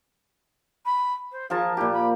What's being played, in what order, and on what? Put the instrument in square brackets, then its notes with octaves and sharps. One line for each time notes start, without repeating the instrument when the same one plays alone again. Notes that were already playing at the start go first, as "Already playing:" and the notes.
[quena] B5
C5
[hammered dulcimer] F3 A#4 A5 [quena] G#4
[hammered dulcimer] A#2 G4 [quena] E4
[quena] B5